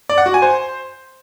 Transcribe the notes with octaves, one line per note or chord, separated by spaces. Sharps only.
D5
F#5
F#4
G#5
C5